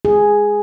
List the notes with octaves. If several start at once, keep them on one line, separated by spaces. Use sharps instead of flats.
G#4